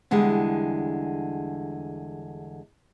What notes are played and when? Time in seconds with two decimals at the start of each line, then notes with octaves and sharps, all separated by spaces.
0.11 E2 D3 G3 G#3